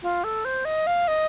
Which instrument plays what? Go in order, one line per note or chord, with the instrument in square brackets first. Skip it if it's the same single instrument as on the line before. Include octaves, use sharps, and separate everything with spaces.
[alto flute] F4
A4
C5
D#5
F5
D#5